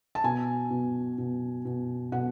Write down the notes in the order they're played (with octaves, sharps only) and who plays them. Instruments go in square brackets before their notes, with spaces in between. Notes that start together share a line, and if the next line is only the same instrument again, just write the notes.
[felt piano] A5
B2 G#5
B2
B2
B2
B2 F#5